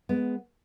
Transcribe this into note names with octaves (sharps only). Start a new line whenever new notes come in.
G#3 B3